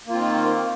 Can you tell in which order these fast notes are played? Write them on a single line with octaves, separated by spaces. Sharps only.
A#3 F4 C4 D#3